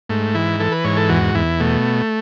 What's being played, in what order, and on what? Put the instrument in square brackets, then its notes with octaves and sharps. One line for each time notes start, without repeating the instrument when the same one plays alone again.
[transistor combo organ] G#2 A3
E3 E4
E3 A4
B4
G#2 C#5
A4
E2 F#4
E2 E4
B2 A3